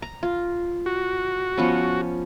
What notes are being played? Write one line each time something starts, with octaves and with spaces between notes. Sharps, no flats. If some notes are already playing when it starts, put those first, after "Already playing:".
A#5
F4
F#4
F3 B3 C#4